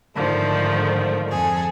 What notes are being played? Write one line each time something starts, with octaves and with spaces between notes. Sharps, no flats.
G#2 D3 D#3 F3 A3
F2 G#4 A4